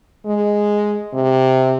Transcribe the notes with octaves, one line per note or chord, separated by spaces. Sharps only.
G#3
C3